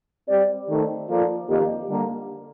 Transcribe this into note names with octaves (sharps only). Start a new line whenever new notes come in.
G3 C4 G4 D5
D#3 A3 C4
F3 A#3 F4 A4 D5
F2 D#3 A#3 D#4 G4
D3 G3 A#3